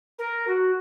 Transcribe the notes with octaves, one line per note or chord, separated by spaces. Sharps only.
A#4
F#4